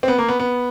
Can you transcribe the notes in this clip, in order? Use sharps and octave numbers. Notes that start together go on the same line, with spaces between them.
C4
B3
A#3
B3
B3